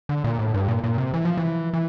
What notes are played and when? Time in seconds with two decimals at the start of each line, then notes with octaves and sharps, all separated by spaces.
0.09 D3
0.24 A#2
0.39 A2
0.54 G2
0.68 A#2
0.84 A#2
0.98 C3
1.14 E3
1.25 F3
1.37 E3
1.73 E3